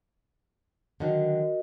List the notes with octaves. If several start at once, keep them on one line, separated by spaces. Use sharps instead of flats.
D3 D#3 F#3 F#4 A#4 D#5